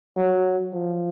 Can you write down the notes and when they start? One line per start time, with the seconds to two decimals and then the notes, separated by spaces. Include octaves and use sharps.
0.17 F#3
0.73 F3